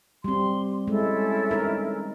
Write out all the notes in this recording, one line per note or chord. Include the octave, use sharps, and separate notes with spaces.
G3 C4 C6
G#3 C#4 E4 A4
D#4 A#4